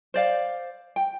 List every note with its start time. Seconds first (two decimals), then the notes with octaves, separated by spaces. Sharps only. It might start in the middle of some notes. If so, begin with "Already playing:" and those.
0.14 C5 D5 F5
0.96 G5